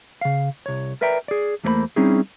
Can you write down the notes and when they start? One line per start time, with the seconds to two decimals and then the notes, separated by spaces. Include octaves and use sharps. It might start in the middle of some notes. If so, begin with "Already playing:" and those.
0.21 C#3 F5
0.66 C2 C#5
1.01 A#4 B4 D5 E5 G5 A#5
1.28 G#4 D5
1.64 E2 A3 A#3 B4 C5 B5
1.96 G3 C4 C#4 D#4 E4 G#4